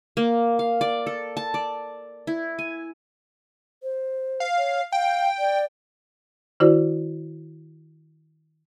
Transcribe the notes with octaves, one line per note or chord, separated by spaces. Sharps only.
A#3
F5
D5
A4
A5
D5
E4
G#5
C5
F5
C#5
F5 G5
D5
D#3 E4 F#4 C5 D5